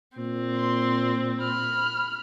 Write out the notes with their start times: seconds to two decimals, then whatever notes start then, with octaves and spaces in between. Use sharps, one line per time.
0.17 A#2 C4
0.56 C6
1.40 B5 F6